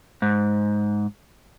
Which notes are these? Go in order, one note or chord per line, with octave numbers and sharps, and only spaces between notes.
G#2